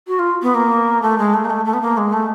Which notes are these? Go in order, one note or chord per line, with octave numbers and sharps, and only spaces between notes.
F#4
F4
B3
A#3
A3
G#3
A3
A#3
A3
A3
B3
A#3
G#3
A3